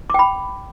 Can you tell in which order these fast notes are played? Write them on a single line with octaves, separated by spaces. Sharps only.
D6 G5 B5